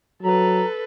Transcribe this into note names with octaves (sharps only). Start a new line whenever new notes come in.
F#3 A4 B4 A#5